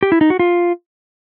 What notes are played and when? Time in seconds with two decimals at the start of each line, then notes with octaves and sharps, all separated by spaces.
0.03 G4
0.12 E4
0.21 D#4
0.30 F#4
0.39 F4